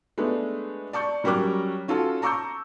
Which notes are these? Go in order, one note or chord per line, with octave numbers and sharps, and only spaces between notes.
G#3 A3 B3 D4
D5 A5 C#6 G6
F#3 G3 C#4 A#4 D6 F#6
C#4 F4 F#4 A4 A5
A5 A#5 C#6 D6 E6 G6